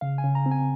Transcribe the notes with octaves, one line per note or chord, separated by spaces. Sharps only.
C#3 F5
G#5
C#3
A#5
C4
G#5